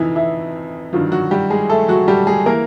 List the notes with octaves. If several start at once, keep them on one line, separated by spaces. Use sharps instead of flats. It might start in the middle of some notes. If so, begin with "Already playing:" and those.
Already playing: F2 C3 E3 F3 D#4 E4
E3 E4
G2 D#3 F3 F#3 F4
F#3 F#4
G3 G4
G#3 G#4
A3 A4
F#3 F#4
G3 G4
G#3 G#4
E3 A#3 A#4